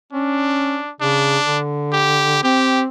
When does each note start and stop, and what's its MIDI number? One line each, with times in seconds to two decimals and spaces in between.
0.12 0.79 61
0.12 0.91 62
1.01 1.38 49
1.01 1.59 62
1.45 2.38 50
1.93 2.41 67
2.43 2.87 60
2.43 2.82 67